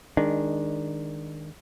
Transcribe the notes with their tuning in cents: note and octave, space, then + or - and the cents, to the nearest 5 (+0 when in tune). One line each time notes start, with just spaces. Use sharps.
D#3 +0 G#3 -15 D4 +0